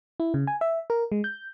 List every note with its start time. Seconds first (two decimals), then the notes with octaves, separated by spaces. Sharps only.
0.20 E4
0.34 C#3
0.47 G#5
0.61 E5
0.90 A#4
1.12 G#3
1.24 G6